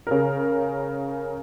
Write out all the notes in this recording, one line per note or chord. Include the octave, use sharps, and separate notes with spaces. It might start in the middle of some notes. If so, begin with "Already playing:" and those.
C#3 A#4